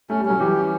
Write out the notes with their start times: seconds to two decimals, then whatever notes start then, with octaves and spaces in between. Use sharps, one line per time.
0.10 A3 C#4
0.19 G3
0.25 F#3 C#4
0.40 E3 G3 G4
0.56 C#4